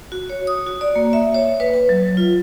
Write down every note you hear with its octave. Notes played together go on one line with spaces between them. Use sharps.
F#4
C#5
D#6
F#4
D5
A#3
E5
C#5
B4
B4
F#3
F4